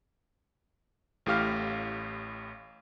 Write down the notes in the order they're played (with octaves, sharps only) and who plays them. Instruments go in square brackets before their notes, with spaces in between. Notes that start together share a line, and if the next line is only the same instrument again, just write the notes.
[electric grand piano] A1 A2 G4 F5 F6